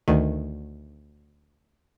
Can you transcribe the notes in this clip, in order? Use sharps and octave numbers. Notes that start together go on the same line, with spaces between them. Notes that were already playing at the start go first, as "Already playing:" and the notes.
D2 D#3